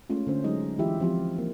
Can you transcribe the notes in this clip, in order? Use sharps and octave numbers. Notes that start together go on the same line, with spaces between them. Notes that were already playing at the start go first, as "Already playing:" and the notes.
G#3 A3 C#4 F4
D3 C#4 C5
F#3 G#3 D#4 D#5
E3 G#3 E4 F4 G4 E5
F3 C4 F4 G4
A#3